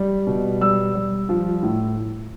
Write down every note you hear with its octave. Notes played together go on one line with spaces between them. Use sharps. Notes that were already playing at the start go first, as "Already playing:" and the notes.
Already playing: G3
B2
G3 E6
G3
F3
A2